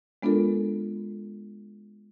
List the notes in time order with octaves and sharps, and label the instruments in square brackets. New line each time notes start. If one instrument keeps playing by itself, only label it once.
[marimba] G#3 B3 D4 F4 A4 A#4